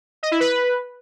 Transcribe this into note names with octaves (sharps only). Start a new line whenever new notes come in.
D#5
E4
B4